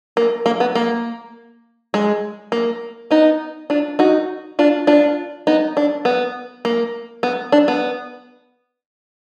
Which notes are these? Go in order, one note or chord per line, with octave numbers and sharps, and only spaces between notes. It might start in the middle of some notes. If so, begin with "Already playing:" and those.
A#3
A#3
B3
A#3
G#3
A#3
B3 D#4
D4 F4
D#4 F#4
D4 F4
D4 F4
B3 D#4
D4
B3
A#3
B3
D4
B3